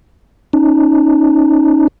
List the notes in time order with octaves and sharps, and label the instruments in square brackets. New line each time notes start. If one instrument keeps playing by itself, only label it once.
[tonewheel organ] C#4 D#4